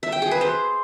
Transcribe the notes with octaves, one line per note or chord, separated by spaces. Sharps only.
E5
G5
G#4
B4
C5